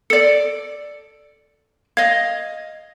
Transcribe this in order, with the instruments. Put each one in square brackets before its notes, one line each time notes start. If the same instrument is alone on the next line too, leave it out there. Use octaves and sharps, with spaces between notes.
[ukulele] A4 D5 [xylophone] C#7
[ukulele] D#5 F5 [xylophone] G#6